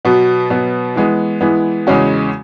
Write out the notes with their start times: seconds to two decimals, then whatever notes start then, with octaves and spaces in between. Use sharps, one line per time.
0.05 B2 F#3 B3
0.50 B2 F#3 B3
0.96 E3 G#3 B3
1.41 E3 G#3 B3
1.87 E2 C#3 G#3 C#4 F#4